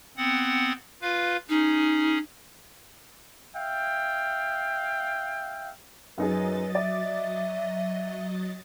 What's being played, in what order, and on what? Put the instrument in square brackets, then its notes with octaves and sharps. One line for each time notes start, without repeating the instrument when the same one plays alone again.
[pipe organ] B3 C4 F#5
F4 B4 F5
[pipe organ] C#4 G#4 [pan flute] D#4
[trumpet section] E5 F5 G5
[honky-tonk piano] F#2 D#4 G#4 [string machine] F#3 D#5 A6 [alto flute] B4
[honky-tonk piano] D5 [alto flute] E5